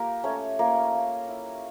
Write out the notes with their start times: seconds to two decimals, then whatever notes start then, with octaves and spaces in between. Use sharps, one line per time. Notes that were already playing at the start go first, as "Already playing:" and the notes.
Already playing: A#3 F4 G4 A#4
0.24 A3 C#4 C#5
0.59 A#3 F4 A#4
0.94 A#3
1.29 E4